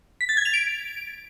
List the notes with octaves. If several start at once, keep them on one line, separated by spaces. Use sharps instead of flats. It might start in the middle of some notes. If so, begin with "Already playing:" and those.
B6
A6
G#6
F7
D7